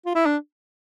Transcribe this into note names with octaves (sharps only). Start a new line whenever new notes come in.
F4
E4
D4